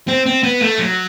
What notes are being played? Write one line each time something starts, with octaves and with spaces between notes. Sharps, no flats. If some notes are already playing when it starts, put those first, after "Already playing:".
C4
C4
B3
A3
F#3